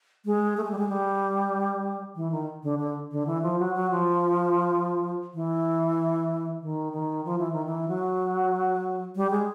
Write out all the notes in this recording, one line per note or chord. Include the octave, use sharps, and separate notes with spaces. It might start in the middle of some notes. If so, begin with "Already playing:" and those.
G#3
A3
G#3
G3
G#3
G3
E3
D#3
D3
D3
D3
E3
F3
F#3
F#3
F3
E3
D#3
D#3
F3
E3
D#3
E3
F#3
G3
G#3